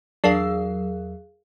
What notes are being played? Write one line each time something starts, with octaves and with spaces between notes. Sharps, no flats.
E2 F#3 D4 G#4 A#4 F5 E6 C7